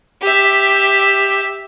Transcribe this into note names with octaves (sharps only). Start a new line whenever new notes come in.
G4 E5